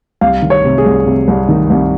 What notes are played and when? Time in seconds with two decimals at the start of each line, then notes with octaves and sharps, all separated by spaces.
0.21 C2 F5
0.42 D#3
0.50 C#5
0.64 C3
0.78 G#4
0.86 C2
1.06 C3
1.28 C2
1.49 D#3
1.70 C2